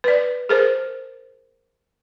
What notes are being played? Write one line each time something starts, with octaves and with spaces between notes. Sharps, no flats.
B4 D5
G#4 A#4 C5